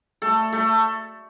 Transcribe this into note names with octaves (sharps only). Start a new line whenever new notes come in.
A3 A4
A3 A4